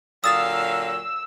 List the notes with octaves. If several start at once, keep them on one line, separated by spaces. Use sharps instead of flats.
A#2 D3 F#3 F5 D#6 E6 A6 E7